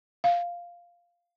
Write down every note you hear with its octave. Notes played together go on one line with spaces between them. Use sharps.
F5